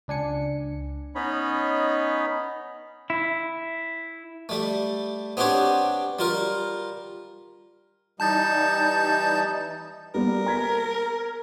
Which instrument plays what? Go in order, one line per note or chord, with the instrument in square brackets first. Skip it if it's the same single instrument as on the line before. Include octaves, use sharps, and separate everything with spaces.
[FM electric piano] C#2 D4 G#5 C#7
[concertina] B3 C#4 D#4 C#5 D#5 B5
[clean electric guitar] E4
[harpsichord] G3 A3
B3 C4 D4 G4 C#5
G3 F4 A#4
[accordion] E3 G3 D#4 [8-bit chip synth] A5 G6 A6
[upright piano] G3 A#3 B3 [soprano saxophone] A#4
[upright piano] A#5 G#6 B6